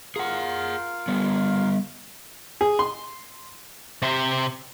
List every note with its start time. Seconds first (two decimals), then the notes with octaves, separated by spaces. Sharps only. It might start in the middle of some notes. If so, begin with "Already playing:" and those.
0.16 F4 G#4 A#4 F5 F#5
1.08 G3 B3
2.61 G#4
2.79 C6
4.02 C3 C5